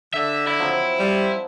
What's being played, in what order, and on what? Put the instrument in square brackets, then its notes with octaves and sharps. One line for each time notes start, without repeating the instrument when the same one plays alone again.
[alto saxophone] D3 [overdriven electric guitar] E5
[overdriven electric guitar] E4
[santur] F3 F#3 C4
[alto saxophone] G3